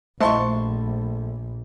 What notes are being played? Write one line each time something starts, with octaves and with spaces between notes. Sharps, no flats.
A#1 A3 C5 D#5 E5 A5 C6 C#6